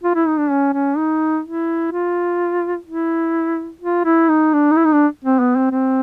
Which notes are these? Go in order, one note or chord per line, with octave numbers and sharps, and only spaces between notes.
F4
E4
D#4
D4
C#4
C#4
D#4
E4
F4
E4
F4
E4
D#4
D4
D#4
E4
D#4
D4
C4
B3
C4
C4